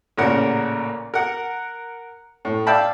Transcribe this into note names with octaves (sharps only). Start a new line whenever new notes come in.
A1 A#2 C#3 A#4 F#5
A#4 F#5
A2
D5 E5 F5 G5 A5 B5